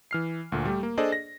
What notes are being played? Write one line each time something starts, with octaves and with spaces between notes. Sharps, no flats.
E3 F6 C7
D2 A#2 A3
G3 A3 G4
A#3
D4 G#4 A4 C5 D5 D#5
A#6